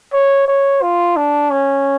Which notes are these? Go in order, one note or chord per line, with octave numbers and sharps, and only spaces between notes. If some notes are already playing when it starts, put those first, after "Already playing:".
C#5
C#5
F4
D4
C#4